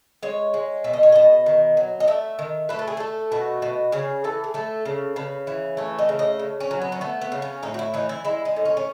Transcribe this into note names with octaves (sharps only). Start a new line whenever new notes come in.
G#3 C#5
G#3
B2 E5
D#5
C#5
B2 D#5
D#3
F#3
D#5
A3 E5
D#3
A3 B4
A4
G#4
A3 A4
B2 F#4
B2
C#3 G#4
E3 A4
G#4
A3 A4
C#3
C#3 B4
E3
A3 C#5
D#5
C#3
D#5
C#3
C#4
F#3
B3
C#4
A3 B3
B3
C#3
C#4
A2 D#4
F#4
E4
E3 D#4
E4
G#3 E4
D#4
A2
C#4
C#4